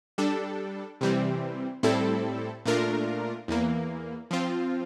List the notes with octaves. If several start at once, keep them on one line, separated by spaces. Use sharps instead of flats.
G3 D4 A4
C3 E3 G3 C4
A2 G3 C4 E4 A4
A#2 A3 D4 F4 A#4
E2 E3 A#3
F3 C4 F4